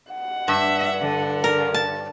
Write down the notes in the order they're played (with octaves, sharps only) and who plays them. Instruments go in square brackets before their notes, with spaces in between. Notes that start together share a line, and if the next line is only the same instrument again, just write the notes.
[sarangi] F#5
[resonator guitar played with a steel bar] G2 [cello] E5
[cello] D3
[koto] A#4
A5